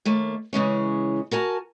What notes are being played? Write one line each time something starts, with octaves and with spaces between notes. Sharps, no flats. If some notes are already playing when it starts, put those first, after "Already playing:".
D#2 A3 A#3
C#3 E3 G#3 C#4
F#4 A#4 G#5 A5